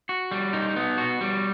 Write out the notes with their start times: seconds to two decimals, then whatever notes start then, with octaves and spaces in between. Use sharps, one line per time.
0.09 F#4
0.32 G3
0.53 D#4
0.76 B3
0.98 F#4
1.21 G3